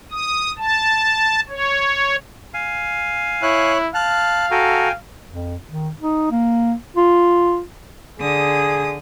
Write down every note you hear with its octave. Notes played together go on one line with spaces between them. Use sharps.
D#6
A5
C#5
F5 G#5
E4 C#5 F#6
F5 A5 F6 F#6
F#4 A4 G5 G#5 A#5
F2
D#3
D#4
A#3
F4
D3 G#4 D#6